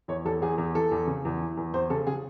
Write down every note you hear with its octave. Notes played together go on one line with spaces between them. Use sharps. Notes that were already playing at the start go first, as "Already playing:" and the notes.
E2 C#5
E2 A4
E2 G#4
E2
E3 A4
E2
C#3
E2
E3
E2
E2 C5
C#3 A4
C#3 G#4